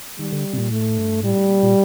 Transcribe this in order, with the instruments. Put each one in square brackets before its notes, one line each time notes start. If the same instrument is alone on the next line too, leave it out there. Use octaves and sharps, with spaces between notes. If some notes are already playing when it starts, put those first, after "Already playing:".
[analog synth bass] D#3 [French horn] G3
[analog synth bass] D3
C3
A#2
[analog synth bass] A2 [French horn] A3
[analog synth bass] G2
[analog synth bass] A2 [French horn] G3
[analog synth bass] A2
A#2
A#2